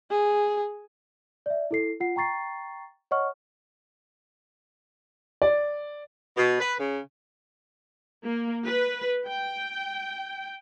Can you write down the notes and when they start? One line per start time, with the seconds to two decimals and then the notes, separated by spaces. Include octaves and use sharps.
0.11 G#4
1.46 D5 E5
1.71 E4 A4 C7
2.00 F4 F#5 C7
2.16 G5 A#5 C#6 A6 C7
3.11 C#5 D#5 F#5 C#6 F6
5.42 D5
6.36 B2
6.60 B4
6.79 C#3
8.25 A#3
8.64 B4
9.28 G5